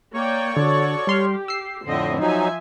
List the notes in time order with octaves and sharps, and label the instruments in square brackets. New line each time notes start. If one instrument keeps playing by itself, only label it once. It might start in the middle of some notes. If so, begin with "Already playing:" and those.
[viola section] A#3 D5 G5 [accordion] C#5 C#6
[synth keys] D3 [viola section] F#4 A4 D5
[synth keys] G3 C6 F6 [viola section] G4
[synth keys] E6 C7
[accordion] F2 A2 D3 [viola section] C4 D#5 E5
[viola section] F3 E5 G#5 [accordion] F#3 D#4